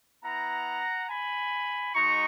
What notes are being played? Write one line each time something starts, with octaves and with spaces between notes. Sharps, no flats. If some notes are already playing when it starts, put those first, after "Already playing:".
B3 E4 F#5 A#5
G#5 B5
G#3 D#4 F#4 A#5 C#6